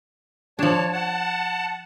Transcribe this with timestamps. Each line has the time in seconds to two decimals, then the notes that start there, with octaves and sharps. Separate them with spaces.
0.59 F3 D4 C#5 A5
0.92 F#5 A5